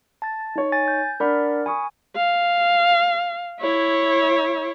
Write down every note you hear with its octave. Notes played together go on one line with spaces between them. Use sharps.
A5 A6
D#4 C#5
G#5 A6
G6
D4 A#4 D5 F#5 B5 F6
G#5 B5 C#6 D#6
F5
E4 C#5